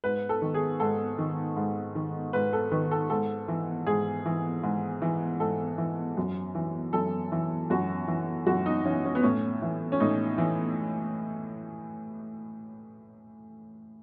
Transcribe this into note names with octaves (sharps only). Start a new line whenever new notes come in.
G#2 B4
A4
D#3
G#4
G#2 A4
D#3
G#2
D#3
G#2 B4
A4
D#3 B4
A4
G#2 A4
E3
G#2 G#4
E3
G#2
E3
G#2 A4
E3
F#2
E3
F#2 A4
E3
F#2 F#4
E3
F#2 F#4
D#4
E3 C#4
C#4
B3
A2 C#4
E3
C#4
A2 D#4
E3